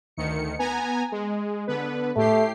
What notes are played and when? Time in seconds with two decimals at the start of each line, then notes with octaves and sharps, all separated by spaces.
0.17 D2 D#3 C#7
0.59 B3 G#5 A#5
1.12 G#3
1.67 D3 B3 B4
2.16 A2 A3 G4 C7